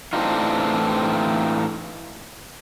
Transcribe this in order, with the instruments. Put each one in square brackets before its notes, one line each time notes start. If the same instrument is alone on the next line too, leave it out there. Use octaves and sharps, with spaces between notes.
[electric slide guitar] A2 E3 C4 D4 D#4 F4